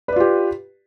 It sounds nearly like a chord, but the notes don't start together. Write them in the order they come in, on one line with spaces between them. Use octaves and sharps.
B4 D5 F4 G4